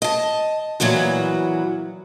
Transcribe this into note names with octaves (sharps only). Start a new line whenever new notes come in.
D#5 A5
A#2 E3 F#3 B3 F#4